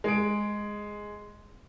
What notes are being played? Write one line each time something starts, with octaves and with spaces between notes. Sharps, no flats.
G#3 D7